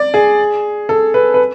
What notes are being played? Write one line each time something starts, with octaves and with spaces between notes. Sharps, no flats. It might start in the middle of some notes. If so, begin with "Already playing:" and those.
Already playing: D5
G#4
A4
B4
B4